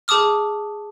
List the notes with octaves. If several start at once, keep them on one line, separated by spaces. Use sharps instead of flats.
G#4 A5 D6 D#6 F6